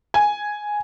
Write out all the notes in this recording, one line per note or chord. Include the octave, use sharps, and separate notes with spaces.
G#5